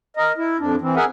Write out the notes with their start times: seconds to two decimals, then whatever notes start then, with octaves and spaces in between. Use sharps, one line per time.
0.17 A#4 D#5
0.38 E4
0.59 F2 D4
0.81 E3 C4
0.96 G#4 A#4 E5 F#5 G#5